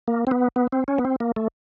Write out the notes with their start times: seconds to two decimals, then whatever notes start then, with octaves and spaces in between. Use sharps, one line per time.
0.08 A#3
0.27 C4
0.31 B3
0.56 B3
0.72 C4
0.88 C#4
0.98 B3
1.05 C4
1.20 A#3
1.36 A3